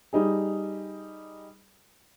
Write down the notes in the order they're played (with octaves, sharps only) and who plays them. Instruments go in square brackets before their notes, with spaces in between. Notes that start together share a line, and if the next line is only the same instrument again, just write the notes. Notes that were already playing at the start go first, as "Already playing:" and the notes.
[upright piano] G3 D#4 G#4